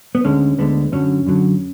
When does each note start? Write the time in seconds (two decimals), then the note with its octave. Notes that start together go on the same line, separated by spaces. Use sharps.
0.15 B3
0.24 D2 D3 G#3 C#4
0.58 D2 D3 G#3 B3
0.92 F#2 D3 F#3 C#4
1.26 F#2 D3 F#3